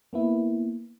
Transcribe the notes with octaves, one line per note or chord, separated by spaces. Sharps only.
A#3 B3 E4